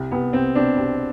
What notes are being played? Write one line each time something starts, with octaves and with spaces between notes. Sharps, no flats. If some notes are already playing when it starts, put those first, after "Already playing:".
Already playing: C2
C2 B3
C2 C4
B2 C4 D4
C2